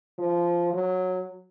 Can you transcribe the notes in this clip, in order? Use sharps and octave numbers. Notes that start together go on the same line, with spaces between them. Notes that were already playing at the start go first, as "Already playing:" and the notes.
F3
F#3